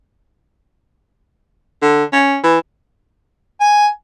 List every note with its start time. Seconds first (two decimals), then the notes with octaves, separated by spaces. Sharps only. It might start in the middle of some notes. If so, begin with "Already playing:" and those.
1.82 D3
2.13 C#4
2.44 E3
3.60 G#5